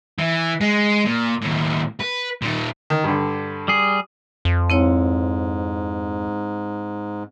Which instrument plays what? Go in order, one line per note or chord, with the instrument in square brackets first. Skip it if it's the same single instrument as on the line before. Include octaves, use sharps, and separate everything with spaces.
[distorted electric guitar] E3
G#3
A#2
D#2 A2
B4
A#2 D#3
[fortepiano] D#3
G2 D3
[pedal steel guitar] G3 G#4
[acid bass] F2
[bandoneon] G#2 [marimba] C4 E4 C#5